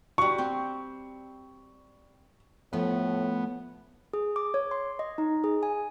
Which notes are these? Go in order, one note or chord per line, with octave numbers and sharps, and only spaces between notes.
G3 F#4 C#6
C4 G5
A2 F3 A3 B3 C#4
G#4
D6
C#5
C6
D#5
D#4
G#4
G#5